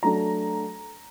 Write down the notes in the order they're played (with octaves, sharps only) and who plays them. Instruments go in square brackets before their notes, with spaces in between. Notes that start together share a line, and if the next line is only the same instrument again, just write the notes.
[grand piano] F#3 A3 D4 A#5